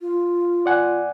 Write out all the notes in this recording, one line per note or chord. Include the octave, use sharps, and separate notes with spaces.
F4
D5 F#5 G#5